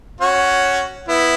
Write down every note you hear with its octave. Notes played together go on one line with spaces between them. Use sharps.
C#4 F#4
B3 E4